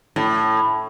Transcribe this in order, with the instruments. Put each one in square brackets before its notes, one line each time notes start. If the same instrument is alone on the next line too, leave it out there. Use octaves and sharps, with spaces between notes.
[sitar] A2